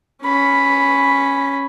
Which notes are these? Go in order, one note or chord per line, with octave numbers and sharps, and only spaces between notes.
C#4 B5